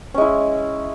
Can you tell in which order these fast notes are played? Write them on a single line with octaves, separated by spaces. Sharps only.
C#4 G#3 E4